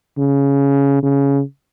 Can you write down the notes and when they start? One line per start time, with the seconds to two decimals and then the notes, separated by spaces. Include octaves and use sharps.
0.18 C#3
1.03 C#3